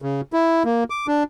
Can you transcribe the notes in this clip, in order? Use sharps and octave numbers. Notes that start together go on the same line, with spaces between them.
C#3
E4
A#3
D6
D4